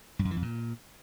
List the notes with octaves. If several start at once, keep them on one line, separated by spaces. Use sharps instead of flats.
G2
F#2
E3
F2
A#2